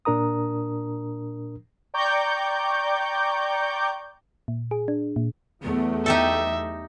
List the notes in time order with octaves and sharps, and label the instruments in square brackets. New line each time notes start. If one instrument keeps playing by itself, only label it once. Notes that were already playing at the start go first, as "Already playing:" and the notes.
[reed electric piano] A#2 D4 A#4 A#5 D#6
[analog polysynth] D5 G5 A#5 C#6 D6 G6
[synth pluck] A#2
G#4
D4
A#2
[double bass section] E2 F#3 A3 [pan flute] B3
[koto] D#4 G4 A4 [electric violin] E5